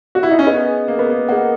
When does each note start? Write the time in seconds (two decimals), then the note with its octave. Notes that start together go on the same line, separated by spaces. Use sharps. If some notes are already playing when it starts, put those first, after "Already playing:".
0.15 F#4
0.23 E4
0.31 D#4
0.39 C#4
0.47 B3 G#4 D#5 F#5
0.88 A#3
0.99 B3
1.10 A#3
1.29 A#3 G#4 D#5 F#5